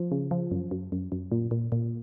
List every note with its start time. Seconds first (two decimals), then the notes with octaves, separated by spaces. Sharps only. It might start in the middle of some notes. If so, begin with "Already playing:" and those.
Already playing: F3
0.12 C#3
0.31 F3
0.51 F#2
0.71 F#2
0.92 F#2
1.12 F#2
1.32 A#2
1.51 A#2
1.72 A#2